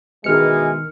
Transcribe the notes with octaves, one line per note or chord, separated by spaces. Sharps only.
B2 D#3 E3 G#3 F6 C#7